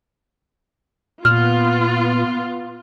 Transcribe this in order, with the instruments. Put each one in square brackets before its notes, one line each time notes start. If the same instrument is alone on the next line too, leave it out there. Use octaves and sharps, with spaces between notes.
[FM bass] A#2 [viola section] B3 F4 [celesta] F6